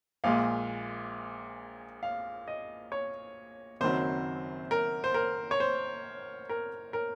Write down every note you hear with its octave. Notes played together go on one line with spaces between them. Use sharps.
A#1 A#2 G#3 F5
F5
D#5
C#5
F#1 F#2 D#3 F#3 C4 C5
A#4
C5
A#4
C#5
C5
A#4
A#4